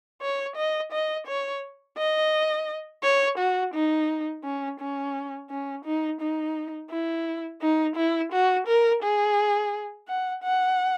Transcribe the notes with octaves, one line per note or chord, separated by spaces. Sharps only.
C#5
D#5
D#5
C#5
D#5
C#5
F#4
D#4
C#4
C#4
C#4
D#4
D#4
E4
D#4
E4
F#4
A#4
G#4
F#5
F#5